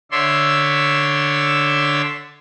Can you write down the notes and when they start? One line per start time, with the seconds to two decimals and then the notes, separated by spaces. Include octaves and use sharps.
0.11 D3 C#5 D5 E5 C6 E6